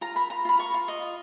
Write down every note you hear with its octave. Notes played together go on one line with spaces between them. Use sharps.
F4 A#5
A#4 B5
F4 A#5
F4 B5
A#4 C#6
F4
D#5
F4